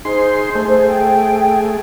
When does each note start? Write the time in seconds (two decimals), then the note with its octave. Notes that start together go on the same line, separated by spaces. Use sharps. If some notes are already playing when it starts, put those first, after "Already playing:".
0.05 D#4 G#4 C5 C6
0.55 A3 G#4
0.87 G5